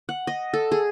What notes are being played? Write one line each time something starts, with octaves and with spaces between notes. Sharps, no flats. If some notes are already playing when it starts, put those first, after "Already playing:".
F#5
D#5
A4
G#4